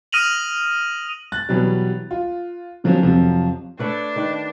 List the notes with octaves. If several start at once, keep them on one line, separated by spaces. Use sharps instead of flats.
D#6 F6 A#6 D#7 F7 F#7
F#6 A6
B2 E3 F#3 G3
F4
D3 F3 F#3 C4 C#4
F2 C3 F3 F#3
A3 D4 B4 C#5
D#3 B4